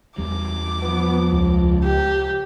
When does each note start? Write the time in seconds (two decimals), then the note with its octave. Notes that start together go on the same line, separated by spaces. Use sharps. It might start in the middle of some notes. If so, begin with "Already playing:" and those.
0.18 E2 G3 D6
0.82 F3 B3
1.32 C#2
1.84 G4